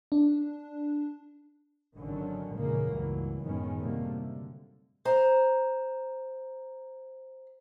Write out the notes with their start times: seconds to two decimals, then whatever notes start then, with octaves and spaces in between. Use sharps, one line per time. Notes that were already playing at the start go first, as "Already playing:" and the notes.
0.12 D4
1.96 G#1 D3 D#3 F#3 C#4
2.54 A#1 E2 G#2 C#3 G#3 A#3
2.89 C#2 G2 E3 F#3
3.42 F#2 A2 D#3 G#3 B3 C#4
3.81 C3 D#3 F#3 G3 A3 A#3
4.16 D3
5.05 C5 A#5